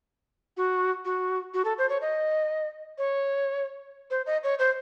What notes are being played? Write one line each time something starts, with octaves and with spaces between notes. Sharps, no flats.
F#4
F#4
F#4
A4
C5
C#5
D#5
C#5
C5
D#5
C#5
C5